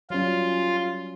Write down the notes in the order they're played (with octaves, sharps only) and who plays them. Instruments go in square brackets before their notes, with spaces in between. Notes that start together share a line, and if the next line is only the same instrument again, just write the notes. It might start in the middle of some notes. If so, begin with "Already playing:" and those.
[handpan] F#3 G3 C#4 [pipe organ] F4